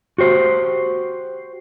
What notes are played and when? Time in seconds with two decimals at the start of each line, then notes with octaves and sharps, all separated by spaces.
0.18 F#4 G4 C5